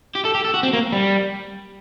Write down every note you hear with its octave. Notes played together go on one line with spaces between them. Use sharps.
G4
A4
G4
A4
F#4
C4
A#3
G3